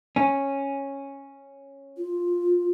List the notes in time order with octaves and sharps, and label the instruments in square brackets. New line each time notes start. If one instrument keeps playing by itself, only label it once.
[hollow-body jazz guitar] C#4
[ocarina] F4